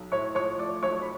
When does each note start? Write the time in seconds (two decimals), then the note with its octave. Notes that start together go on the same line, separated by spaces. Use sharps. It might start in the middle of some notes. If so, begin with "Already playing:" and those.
Already playing: B1
0.12 A2 C#5 C#6
0.35 F3 C#5 C#6
0.59 A3 D5 D6
0.83 B1 C#5 C#6
1.02 B5